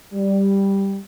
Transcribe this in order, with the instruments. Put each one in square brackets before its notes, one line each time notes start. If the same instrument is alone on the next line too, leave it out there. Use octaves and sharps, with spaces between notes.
[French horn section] G3